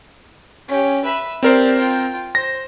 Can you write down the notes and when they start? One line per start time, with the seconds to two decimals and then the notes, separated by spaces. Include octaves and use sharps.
0.68 C#4 G4
1.05 B4 E5
1.43 C4 G4 A#4 C5 D5
1.78 F4 G5
2.35 C5 A#6